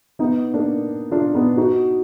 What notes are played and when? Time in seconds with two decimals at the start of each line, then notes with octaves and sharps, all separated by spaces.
0.19 B3 D#4
0.54 A#3 D4
1.11 D4 F4
1.34 B3 D#4
1.57 D#4 F#4